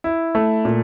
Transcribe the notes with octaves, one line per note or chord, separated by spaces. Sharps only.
E4
A3
A#2